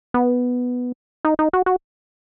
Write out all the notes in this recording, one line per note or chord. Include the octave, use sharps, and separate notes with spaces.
B3
D#4
D#4
F#4
F#4